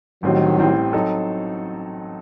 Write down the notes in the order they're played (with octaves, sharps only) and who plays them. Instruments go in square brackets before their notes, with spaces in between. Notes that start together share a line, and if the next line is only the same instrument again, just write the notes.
[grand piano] A1 A2 G3 C4 [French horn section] D#3 F#3
[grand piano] A1 A2 G3 C4
F#3 C4 D#4 A4